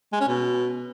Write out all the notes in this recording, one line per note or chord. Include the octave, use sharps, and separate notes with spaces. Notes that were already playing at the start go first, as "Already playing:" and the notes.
G#3
C#4
B2